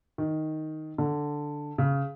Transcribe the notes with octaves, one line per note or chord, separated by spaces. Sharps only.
D#3
D3
C#3